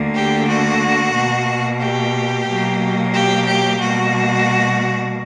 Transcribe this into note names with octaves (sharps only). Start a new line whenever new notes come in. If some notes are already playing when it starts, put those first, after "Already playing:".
Already playing: D2 D3 A#3
G4
F#4
B2 A#3
G4
B2 F#3 A#3
G4
G4
B2 G3 A#3 F#4